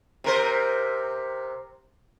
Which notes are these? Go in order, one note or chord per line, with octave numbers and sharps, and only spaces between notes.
C3 A#4 C5